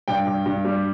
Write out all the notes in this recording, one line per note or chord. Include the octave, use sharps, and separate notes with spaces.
G2 G5
G2
G2
G3